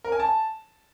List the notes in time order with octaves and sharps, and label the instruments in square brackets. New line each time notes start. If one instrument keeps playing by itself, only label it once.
[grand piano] A#4
G#5
A5